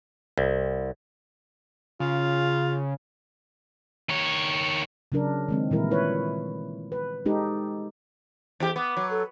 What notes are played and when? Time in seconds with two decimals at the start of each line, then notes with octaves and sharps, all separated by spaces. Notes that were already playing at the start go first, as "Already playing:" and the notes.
0.38 C2
2.00 C#3 F4
4.09 D#3 C#5
5.12 C#3 F#3 D4 A#4
5.48 D#3 G#3 C4
5.71 A#2 D#3 E3 G3 E4 A#4
5.91 E4 B4 C#5
6.92 B4
7.26 G#3 D#4 G4 A4
8.60 E2 G4
8.76 B3 D6
8.97 F#3
9.10 A4